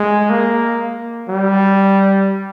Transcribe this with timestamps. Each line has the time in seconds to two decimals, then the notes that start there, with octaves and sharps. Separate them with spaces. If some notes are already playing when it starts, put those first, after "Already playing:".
Already playing: G#3
0.30 A#3
1.29 G3